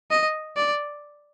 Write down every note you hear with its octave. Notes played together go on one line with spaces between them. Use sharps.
D#5
D5